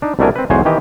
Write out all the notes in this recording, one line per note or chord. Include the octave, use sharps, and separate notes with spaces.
D4 D#4
C2 B2 A3 D4 A#4 G#5
C4 B4
B1 E2 G#3 G#4 C5 C#5
D#3 E3 G4 D#5